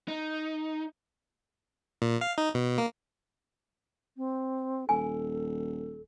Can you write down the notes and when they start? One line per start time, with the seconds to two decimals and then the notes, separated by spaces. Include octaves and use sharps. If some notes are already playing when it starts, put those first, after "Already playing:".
0.08 D#4
2.02 A#2
2.21 F5
2.38 D#4
2.54 B2
2.78 A#3
4.17 C4
4.89 D#1 A4 G#5